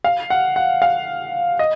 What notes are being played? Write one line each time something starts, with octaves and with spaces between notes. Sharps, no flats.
F5
F#5
F#5
F5
D#5